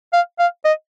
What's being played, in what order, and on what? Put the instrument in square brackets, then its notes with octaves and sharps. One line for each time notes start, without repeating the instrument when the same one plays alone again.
[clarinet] F5
F5
D#5